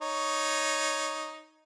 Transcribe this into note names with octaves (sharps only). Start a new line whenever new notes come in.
D#4 C#5